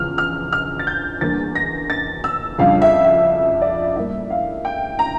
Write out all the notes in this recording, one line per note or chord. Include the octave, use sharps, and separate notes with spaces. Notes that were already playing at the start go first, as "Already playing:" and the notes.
Already playing: E2 C#3 F3 F6
F6
F6
A6
G6
E2 D3 G3 A#3 D4 A6
A#6
A6
E6
F2 C#3 G3 D4 F4 F5
E5
E5
D5
A2 G3 A#3 E5
F5
G5
A#5